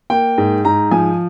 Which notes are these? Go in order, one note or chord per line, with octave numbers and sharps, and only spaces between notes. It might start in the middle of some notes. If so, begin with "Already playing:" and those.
A#3 G5
G#2
G#2 A#5
F3 G#5